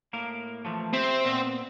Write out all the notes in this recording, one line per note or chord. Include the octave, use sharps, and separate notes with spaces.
A2 A#3 A#4
E3 F3 A3
C4 G4 C5 E5
A#2 B3